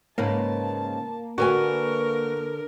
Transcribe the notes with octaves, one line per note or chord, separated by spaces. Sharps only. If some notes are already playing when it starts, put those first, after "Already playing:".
G#2 C#3 A#3 B4 A5
D3 F#4 A#4 B4 G#5